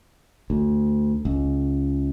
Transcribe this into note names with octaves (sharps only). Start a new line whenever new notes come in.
D2
C#2